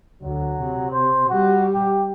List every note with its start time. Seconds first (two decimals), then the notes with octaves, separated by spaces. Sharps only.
0.23 D2 F#3
0.62 C3
0.92 C5
1.30 G3 F#4
1.74 G4